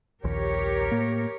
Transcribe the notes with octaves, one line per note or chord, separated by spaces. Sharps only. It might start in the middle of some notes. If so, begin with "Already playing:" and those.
A#1 D#2 G4 A#4 C#5
A2 A#3